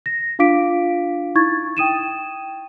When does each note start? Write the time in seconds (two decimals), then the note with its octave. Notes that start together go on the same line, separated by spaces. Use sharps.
0.06 A#6
0.39 D4 F4 F5 D6 B6 D7
1.35 D#4 E4 C#6 G#6 A6
1.77 G5 D#6 D#7 E7